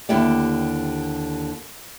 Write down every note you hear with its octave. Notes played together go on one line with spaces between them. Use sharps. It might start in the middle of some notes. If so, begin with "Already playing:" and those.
D#2 D3 E4 G4 D5